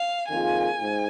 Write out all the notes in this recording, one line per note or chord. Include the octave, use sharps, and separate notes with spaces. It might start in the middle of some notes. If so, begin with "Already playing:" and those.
Already playing: F5
F2 D#3 A#3 F4 G#4 G#5
G#2